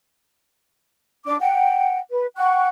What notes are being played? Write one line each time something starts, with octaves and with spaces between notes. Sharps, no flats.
D4 D6
F#5 G5
B4
F#5 G5 C#6 F#6